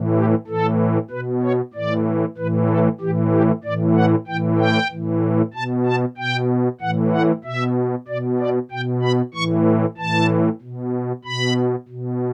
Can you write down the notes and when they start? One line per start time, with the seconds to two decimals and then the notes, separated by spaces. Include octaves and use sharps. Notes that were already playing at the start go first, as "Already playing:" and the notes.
Already playing: A2 E3
0.15 G4
0.47 A2 E3 A4
1.10 B2 B4
1.43 C#5
1.73 A2 E3 D5
2.37 A2 E3 B4
2.69 A4
3.00 A2 E3 G4
3.32 G4
3.64 A2 E3 D5
3.95 F#5
4.27 A2 E3 G5
4.59 G5
4.91 A2 E3
5.54 B2 A5
5.86 A5
6.17 B2 G5
6.81 A2 E3 F#5
7.13 F#5
7.44 B2 E5
8.08 B2 D5
8.40 D5
8.71 B2 G5
9.03 B5
9.34 A2 E3 C#6
9.98 A2 E3 A5
10.62 B2
11.25 B2 B5
11.89 B2